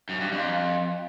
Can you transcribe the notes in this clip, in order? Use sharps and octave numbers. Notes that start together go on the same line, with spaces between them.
F#2
G2
F2